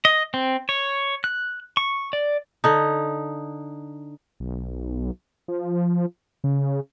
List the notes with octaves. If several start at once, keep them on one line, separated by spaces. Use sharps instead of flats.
D#5
C4
C#5
F#6
C#6
D5
D3 D#4
B1
F3
C#3